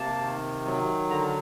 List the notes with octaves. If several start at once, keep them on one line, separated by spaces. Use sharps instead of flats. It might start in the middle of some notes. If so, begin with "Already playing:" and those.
Already playing: C3 A#3 A5
D#3
F#3
D3 A#5